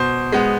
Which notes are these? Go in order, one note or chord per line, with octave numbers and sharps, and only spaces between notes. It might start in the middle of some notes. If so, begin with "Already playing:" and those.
Already playing: B2 C5
G#3 B3